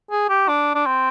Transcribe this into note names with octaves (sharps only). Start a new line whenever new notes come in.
G#4
G4
D4
D4
C4